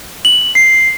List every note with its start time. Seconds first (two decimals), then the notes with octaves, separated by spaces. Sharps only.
0.25 F#7
0.55 C7